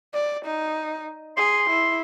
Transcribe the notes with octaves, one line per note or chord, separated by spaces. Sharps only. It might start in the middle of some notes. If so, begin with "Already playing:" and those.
D5
D#4
G#4 C6
E4